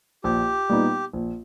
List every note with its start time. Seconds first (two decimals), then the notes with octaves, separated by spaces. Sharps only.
0.24 A#1 G4
0.69 A#2 G3 B3 D#4
1.13 A#1